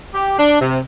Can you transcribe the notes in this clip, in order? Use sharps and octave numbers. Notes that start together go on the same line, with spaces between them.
G4
D4
C3